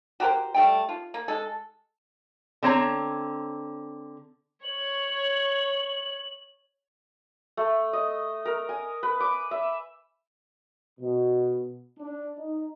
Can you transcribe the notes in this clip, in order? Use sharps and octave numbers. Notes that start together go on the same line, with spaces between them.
F#4 G4 A#4 C5
G3 A3 G5
F4
A#3
G#3 A4
D3 C4 C#5 A#5
C#5 F#7
A3
D#5
A#4
G#5
B4
D6
E5
B2
D4
D#4